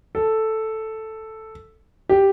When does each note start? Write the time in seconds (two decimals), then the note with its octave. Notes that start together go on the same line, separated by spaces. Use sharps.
0.15 A4
2.09 G4